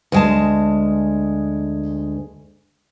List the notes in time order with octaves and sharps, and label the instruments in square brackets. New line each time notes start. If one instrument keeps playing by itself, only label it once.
[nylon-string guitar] D2 G#3 A5